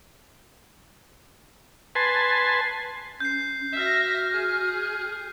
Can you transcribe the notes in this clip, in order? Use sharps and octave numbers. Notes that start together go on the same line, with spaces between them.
B4 G#5 A5 C6
C#4 G6 C7
F#4 E5 F6 A#6
G#4